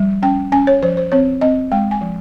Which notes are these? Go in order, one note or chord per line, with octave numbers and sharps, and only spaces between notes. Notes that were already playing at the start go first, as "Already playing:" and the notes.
Already playing: F3 G3
C#4 G5
C#4 G#5
C#5
F3 C5
C5
C4 C#5
C4 D#5
G#3 G5
G#5
F3